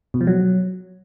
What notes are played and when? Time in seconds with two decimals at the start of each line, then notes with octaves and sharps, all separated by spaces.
0.14 B2
0.21 F3
0.27 F#3